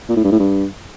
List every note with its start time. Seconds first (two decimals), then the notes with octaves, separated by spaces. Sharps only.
0.09 A#2
0.16 A2
0.24 G2
0.32 A2
0.39 G2